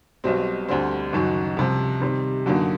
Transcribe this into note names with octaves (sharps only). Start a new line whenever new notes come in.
B1 B2 G3 C4
D2 D3 G3 C4
F#1 F#2 D#3 F#3
C2 C3 F3
C3 D#3 G3
F#2 D3 F#3 A#3 D#4